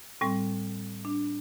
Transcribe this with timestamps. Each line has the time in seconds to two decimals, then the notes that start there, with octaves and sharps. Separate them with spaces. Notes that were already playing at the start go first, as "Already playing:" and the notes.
0.21 A2 G3 C4
1.05 D4